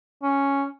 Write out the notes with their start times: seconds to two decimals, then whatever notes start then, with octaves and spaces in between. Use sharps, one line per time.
0.23 C#4